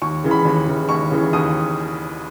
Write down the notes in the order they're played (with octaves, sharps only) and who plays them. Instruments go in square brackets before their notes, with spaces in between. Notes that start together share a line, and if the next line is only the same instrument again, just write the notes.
[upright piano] D#2 C#6
C#3 E3
B5
D#2
C#3 E3
D#2 C#6
C#3 E3
D#2 D#6